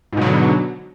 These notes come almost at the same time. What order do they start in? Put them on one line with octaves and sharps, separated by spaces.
G#2 B2 F#3 D3